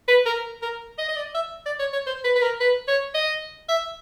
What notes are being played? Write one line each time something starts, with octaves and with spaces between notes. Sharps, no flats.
B4
A#4
A#4
D#5
D#5
D5
E5
D5
C#5
C#5
C5
B4
B4
A#4
B4
C#5
D#5
E5